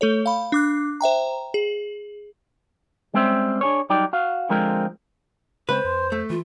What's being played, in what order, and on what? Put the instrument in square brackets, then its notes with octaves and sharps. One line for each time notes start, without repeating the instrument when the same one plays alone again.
[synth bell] A3 A4 C#5
F5 B5
D4 D6 F#6
C5 E5 G5 A#5
G#4
[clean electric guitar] G3 G#3 C4 C#4 C5 E5
D4 G#4 C#5
F#3 G3 D#4 G4 D5
F#4 F5
D3 F3 G#3 C4 F4 A#4
[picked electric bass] C#3 G#3 C4 [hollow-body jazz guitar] B4 [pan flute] C5 [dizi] C#6
[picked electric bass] F2 [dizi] C6
[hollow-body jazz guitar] A3 [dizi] A4
[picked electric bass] E3 [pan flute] F4